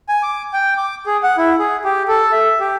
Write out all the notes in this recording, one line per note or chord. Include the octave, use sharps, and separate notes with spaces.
G#5
D6
G5
D6
G#4
F#5
E4
G#4
G4
A4
E5
G4